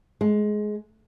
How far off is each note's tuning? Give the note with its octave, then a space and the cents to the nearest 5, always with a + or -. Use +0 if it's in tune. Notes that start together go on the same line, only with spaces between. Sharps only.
G#3 +15